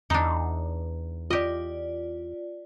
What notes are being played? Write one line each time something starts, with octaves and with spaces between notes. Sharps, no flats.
E2 D4 D#4
F4 G4 D5 D#5